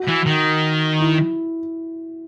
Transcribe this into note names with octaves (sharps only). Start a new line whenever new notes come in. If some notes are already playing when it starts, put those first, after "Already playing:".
Already playing: F#4
E3
D#3
E4